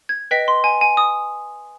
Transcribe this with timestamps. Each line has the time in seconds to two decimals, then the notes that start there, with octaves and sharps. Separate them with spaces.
0.09 G#6
0.31 B4 D#5 G5 B6
0.48 C6
0.64 G#5
0.81 G#5
0.97 D#6